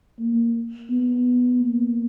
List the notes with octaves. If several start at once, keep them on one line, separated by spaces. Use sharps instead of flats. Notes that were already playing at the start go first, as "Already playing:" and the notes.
A#3
B3
A#3